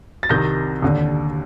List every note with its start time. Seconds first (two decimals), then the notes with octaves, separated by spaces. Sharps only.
0.23 A6
0.29 C2 C3 D#3 G6 A#6
0.82 D#2 D3